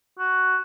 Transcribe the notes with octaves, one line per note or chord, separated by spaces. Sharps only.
F#4